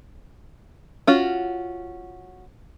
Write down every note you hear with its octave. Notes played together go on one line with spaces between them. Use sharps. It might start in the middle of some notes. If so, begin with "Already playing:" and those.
C#4 F4 F#4